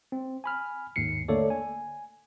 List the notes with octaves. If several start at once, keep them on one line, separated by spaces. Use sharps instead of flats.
C4
G#5 B5 F6
D#2 G#2 C7 C#7
D3 A3 A#3 A4 C#5 D5
G#5